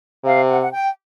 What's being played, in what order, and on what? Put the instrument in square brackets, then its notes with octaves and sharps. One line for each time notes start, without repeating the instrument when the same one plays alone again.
[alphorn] C3 [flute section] F5
[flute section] F#5
F#5
G5